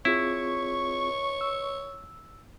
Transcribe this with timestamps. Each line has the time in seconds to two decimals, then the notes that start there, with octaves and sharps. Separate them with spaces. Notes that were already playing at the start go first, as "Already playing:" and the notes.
0.05 C4 E4 F4 G#4 C#5 C#6
1.41 E6